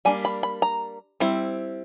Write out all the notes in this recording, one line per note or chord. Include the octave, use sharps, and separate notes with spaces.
G3 A#3 D4 G#5
B5
B5
A#5
G3 C4 E4